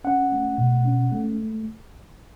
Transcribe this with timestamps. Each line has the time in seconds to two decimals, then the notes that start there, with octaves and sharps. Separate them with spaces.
0.04 C#4 F#5
0.32 A3
0.58 B2
0.85 C#4
1.12 A3